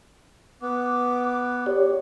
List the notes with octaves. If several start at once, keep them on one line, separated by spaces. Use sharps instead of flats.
B3 D6
G4 C#5 D5